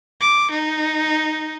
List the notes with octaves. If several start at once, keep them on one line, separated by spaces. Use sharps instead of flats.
D6
D#4